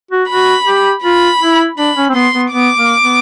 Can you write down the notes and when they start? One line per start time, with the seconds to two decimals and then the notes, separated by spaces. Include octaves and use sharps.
0.11 F#4
0.29 F#4 B5
0.67 G4
1.04 F4 B5
1.41 E4
1.78 D4 B5
1.97 C#4
2.09 C4
2.15 B3 C6
2.34 B3
2.52 B3 D6
2.77 A#3
3.02 B3